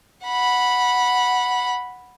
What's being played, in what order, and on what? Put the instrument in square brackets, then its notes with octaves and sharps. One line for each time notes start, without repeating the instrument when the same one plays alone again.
[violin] F#5 B5